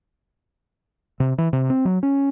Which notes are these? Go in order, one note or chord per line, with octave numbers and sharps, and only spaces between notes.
C3
E3
C3
C4
F#3
C#4